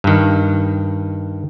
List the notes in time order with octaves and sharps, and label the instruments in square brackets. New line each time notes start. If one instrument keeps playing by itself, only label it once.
[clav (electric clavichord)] G2 D#3